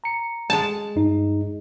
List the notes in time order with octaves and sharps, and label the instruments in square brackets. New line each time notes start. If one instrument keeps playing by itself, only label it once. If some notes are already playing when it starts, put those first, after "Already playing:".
[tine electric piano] A#5 C#7
[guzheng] G#3 A5
[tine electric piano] G2 D#4